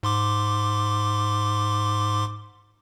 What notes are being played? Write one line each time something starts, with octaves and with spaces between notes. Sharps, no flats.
G#2 C6 D6